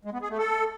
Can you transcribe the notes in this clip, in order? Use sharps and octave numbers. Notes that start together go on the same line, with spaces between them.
G#3
B3
G#4
A3
A4